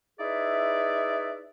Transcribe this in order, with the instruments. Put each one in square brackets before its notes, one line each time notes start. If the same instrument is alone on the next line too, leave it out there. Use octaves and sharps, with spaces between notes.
[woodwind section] D#4 E4 G#4 B4 D5 E5